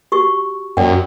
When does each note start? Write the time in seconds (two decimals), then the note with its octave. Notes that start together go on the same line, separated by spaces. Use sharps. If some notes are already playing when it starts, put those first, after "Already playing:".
0.12 F#4 G4 C#6
0.77 F#2 D5 F#5 G5